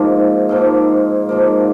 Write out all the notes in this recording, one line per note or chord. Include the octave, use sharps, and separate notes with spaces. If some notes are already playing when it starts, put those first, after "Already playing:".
Already playing: G#2 F3 A#3
G#2 F3 A#3
G#2 F3 A#3